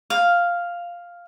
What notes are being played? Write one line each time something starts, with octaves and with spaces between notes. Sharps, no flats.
F5